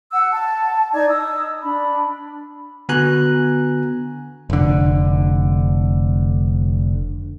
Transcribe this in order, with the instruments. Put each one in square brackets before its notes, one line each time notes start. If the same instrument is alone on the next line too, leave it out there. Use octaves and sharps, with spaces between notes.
[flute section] F#5 E6
A5
D#4 D5 G#6
D#5 D#6 E6
D4 B5
[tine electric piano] D3 B3 F#4 G#5 A#5 F#6
[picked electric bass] F1 D3